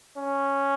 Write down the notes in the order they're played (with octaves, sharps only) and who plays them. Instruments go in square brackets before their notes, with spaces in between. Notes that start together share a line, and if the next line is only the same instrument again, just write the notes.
[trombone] C#4